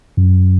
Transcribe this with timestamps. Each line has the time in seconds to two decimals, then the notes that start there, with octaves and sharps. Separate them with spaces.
0.17 F#2